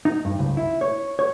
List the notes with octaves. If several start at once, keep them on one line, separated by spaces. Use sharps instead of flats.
D#4
G2
C#2
E4
C#5
C#5